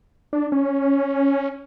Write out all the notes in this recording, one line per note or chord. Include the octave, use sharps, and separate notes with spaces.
D4
C#4